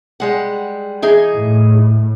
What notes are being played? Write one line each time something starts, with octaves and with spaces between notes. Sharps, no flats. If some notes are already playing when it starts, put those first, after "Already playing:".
G3 G#3 F#5
E3 D#4 G#4
A2